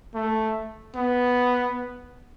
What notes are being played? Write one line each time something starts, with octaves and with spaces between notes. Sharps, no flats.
A3
B3